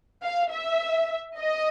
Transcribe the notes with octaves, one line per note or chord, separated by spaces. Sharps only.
F5
E5
D#5